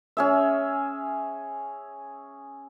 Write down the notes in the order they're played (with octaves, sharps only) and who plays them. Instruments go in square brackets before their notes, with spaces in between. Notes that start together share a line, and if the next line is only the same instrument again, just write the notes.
[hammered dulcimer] C#4 G#4 E5